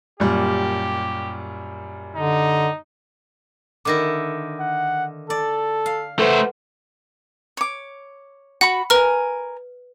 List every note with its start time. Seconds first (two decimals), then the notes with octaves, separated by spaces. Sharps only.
0.20 F#2 A#2 G3 G4
2.16 D3 D#4
3.85 D3 D#3 E4 D6 A#6
4.60 F#5
5.30 A4 D5
5.86 F5
6.19 A3 A4 B4 C5 F#5
7.57 C#5 D6
8.61 F#4 F#5 B5
8.90 A#4 B4 G#5 F6